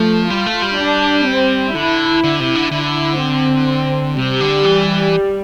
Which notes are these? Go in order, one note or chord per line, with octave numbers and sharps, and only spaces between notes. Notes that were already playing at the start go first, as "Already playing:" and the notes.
Already playing: F3 A3
G3 F4
A3
G3
D4
C4
D3 E4
D3
C3
D3
D3 E4
C4
C3 G3
D3
E3